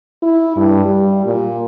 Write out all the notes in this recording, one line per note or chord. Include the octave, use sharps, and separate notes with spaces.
E4
G2
G3
A#2